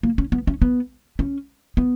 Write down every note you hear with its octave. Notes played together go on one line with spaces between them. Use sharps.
A#3
C#4
B3
C#4
B3
C#4
B3